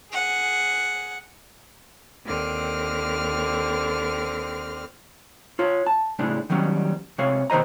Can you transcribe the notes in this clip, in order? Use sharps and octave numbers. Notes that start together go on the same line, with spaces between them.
G#4 F#5
D#2 D3 C4 F6
F4 C#5
A5
A2 C#3 G#3 D4
D#3 F#3 G3 C#4
C3 G#3 C#5 F5
B2 D#3 C5 D#5 A#5